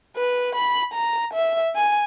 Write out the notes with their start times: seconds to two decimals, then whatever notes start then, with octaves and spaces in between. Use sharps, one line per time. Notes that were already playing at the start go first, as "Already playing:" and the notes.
0.16 B4
0.55 B5
0.94 A#5
1.34 E5
1.76 G#5